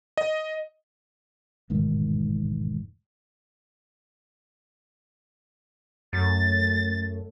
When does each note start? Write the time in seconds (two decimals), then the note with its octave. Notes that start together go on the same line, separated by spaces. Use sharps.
0.17 D#5
1.70 E1 A1 G#2 D#3
6.13 F#2 A3 A6